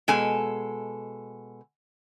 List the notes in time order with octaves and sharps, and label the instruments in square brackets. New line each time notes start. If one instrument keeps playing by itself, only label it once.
[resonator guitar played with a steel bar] B2 G#3 A4 G#5